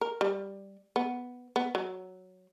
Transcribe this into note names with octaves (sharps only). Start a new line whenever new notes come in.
A#4
G3
B3
B3
F#3